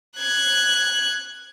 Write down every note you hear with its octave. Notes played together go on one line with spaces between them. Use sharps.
F#6 G#6